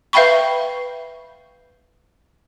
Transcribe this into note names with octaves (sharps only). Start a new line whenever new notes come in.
B4 E5 F5 G5 B5 C#6